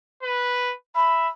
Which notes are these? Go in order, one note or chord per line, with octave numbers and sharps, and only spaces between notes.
B4
E5 B5